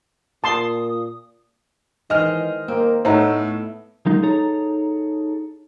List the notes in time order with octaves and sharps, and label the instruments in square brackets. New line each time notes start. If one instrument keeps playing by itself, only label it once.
[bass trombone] A#2 [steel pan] A5 C6 [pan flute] D#6
[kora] D#3 G#3 C5 [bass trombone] E3 [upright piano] D#5 F6
[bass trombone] A#3 [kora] C4
[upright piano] A2 [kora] A3 B3 A4 [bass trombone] D#4 [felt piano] C#5 F#5 A#5
[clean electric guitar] F#3 G#3 A#3 D#4
D#4 G#4 A4 C#5 A#5